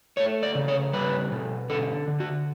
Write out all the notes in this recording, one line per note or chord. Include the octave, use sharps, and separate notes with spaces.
A3 C#5
D5
C#3
C#5
G3 B4
B2
D3 A4
D3
F#4